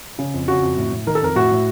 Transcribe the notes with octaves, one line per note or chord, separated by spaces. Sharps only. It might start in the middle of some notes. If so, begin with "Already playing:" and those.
C#3
F2
C#3 F#4
F2
A2
A2
D#3 A#4
A4
F2 A#4
A2 F#4
A2